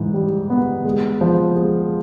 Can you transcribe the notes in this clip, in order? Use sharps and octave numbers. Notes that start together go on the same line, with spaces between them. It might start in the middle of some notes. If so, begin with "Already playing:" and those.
Already playing: G#2 E3
G3
B3
G#3
F3
G#3